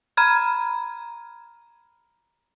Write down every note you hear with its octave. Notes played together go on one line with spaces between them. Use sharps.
A#5 B5 F6 G#6